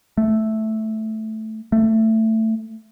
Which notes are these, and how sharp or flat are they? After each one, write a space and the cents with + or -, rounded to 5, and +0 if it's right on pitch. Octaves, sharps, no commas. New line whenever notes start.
A3 -5
A3 +15